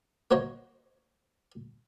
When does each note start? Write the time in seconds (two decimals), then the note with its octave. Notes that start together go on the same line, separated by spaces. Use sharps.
0.31 A#3 F#4 C5 C#5 D#5